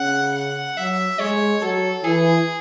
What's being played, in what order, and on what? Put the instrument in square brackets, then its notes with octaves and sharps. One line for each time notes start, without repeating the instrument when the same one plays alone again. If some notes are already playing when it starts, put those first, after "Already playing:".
Already playing: [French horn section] C#3 [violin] F#5
[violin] F#5
[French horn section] F#3 [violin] E5
[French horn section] G#3 [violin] C#5
[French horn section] F#3 [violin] A4
[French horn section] E3 [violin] G#4